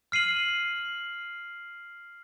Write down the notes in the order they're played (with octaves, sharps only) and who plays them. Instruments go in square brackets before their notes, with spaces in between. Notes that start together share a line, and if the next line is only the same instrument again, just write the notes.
[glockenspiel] F6 C7 D#7 F#7